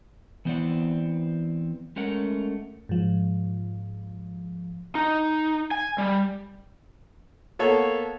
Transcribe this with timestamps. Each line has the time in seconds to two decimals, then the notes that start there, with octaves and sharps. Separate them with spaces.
0.45 E3 B3 C4 E4 D5 F#5
1.96 G#3 A3 C#4 A#4 F#5
2.89 G#2 F3
4.95 D#4
5.71 G#5
5.98 G3
7.59 A#3 B3 A4 C#5